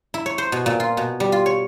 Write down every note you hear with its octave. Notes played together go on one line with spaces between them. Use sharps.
E4
C#5
C5
B2
A#2
F4
B2
G3
F4
C#5